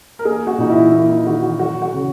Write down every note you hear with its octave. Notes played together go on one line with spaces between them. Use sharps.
A#4
A#3 G#4
F#4
A#2 D#4
E4
A#3 E4
D#4
D#3 F#4
F#4
F#3 F#4
F#4
C#3